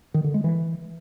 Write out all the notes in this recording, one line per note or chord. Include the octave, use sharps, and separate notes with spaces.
D#3
D3
G#3
E3